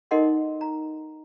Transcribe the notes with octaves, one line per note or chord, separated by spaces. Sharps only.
D#4 A4 A#4 D#5 F#5 C6
A#5